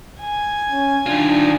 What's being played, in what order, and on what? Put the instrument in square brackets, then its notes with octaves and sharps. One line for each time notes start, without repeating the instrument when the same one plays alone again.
[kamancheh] G#5
[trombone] C#4
[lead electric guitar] D#3 F4 [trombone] D4